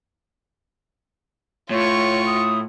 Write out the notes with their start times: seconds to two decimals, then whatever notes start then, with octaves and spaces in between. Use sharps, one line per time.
1.70 A2 F4 C#5 C#6
2.26 D#6